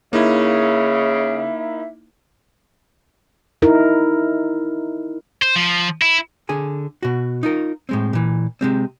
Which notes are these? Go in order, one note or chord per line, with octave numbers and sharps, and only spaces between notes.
C#3 A#3 D#4 E4 E5
D#4 E4 A#4
C5
F3
E4
D3 G#4 G#5
B2 F#4
D#4 F4 A#4
A2 G#3 C4
A#2 E3
C3 G#3 C4